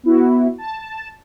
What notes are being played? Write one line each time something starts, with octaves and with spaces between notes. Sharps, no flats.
B3 E4 F#4
A5